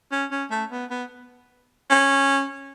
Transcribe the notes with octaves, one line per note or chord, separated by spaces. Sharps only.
C#4
C#4
A3
B3
B3
C#4